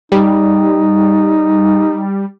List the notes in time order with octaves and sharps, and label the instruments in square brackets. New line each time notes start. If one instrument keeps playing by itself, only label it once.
[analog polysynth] G3 [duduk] D#4